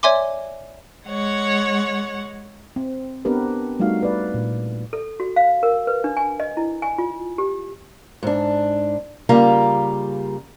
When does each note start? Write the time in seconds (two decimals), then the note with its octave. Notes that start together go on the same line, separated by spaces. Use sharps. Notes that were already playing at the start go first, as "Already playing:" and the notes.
0.03 C#5 D5 E5 G#5 C6 D6
1.06 G#3 C#5 F#5
2.76 C4
3.25 B3 C4 D4 G4 A#4 B4
3.80 G3 A3 D#4 F#4 F5
4.02 B4 D5
4.34 A#2
4.93 A4
5.20 F#4
5.36 F5
5.63 A#4
5.87 B4
6.04 D4
6.17 G#5
6.40 D#5
6.57 E4
6.82 G#5
6.98 F4
7.38 G4
8.23 G#2 D4
9.29 C#3 G3 A#3 F4 A#5